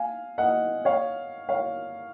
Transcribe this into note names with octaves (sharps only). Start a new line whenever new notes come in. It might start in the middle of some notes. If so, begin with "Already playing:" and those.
Already playing: F5 G#5
D#5 F#5
C#5 F5
C#5 F5